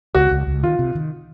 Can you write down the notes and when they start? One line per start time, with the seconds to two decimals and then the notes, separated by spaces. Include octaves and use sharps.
0.15 C#2 F#4
0.31 C#2
0.47 C#2
0.63 D#3 F4
0.79 C3
0.95 D#3